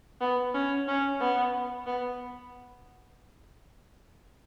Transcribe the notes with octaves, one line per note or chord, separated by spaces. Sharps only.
B3
C#4
C#4
B3
B3